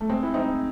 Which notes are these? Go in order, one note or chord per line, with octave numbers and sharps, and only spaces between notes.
A3
G#3 C4
E4
C4 D#4